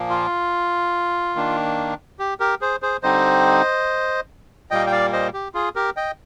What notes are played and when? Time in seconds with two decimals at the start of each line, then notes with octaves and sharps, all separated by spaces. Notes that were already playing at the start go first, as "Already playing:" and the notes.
Already playing: A#2 F3 A#3
0.10 F4
1.36 D#3 A#3 D4
2.19 G4
2.40 G4 A#4
2.61 G#4 C5
2.82 G#4 C5
3.03 D3 G3 C4 D#4 C5 D#5
4.71 A#2 G3 A#3 D#5 G5
4.86 G5
4.92 D5 F5
5.13 C5 D#5
5.34 G4
5.54 F4 G#4
5.76 G4 A#4
5.97 D#5 G5